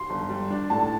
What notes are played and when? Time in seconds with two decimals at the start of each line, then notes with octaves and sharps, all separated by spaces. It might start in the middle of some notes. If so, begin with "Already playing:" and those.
Already playing: C6
0.10 G1
0.30 G3
0.50 D4
0.70 A2 A5